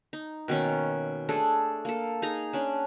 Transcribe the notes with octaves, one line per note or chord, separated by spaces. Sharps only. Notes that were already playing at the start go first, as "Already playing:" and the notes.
D#4
B2 D#3 A#3 C#4
A3 D4 G#4 A4
A#3 A4
D#4 G#4 A#5
C#4 D4